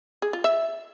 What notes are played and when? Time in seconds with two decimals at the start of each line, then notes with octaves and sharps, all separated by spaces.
0.22 G#4
0.33 F4
0.44 E5